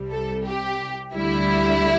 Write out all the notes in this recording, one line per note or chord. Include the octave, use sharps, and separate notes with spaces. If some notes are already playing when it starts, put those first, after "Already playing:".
Already playing: C2 C3 G3
A4
G4
D2 D3 G3 E4